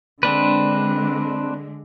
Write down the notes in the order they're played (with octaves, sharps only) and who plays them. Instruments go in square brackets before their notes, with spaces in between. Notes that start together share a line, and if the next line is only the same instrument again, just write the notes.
[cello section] D3 G#3 [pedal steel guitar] C4 D4 B4